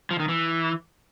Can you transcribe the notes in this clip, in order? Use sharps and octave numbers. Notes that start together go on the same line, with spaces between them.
F3
D#3
E3